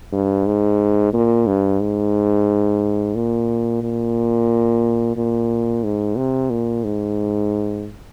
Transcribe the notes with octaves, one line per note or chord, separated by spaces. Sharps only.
G2
G#2
A#2
G2
G#2
A#2
A#2
A#2
G#2
C3
A#2
G#2